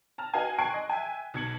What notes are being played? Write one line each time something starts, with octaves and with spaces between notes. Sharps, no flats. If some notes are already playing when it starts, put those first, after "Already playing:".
A5 A#5 F6
F#4 B4 D#5 F5 G#5
G#5 C#6 F#6 C7 D7 D#7
D#5 C6
E5 G5 G#5
B1 B2 G#6 C#7 F#7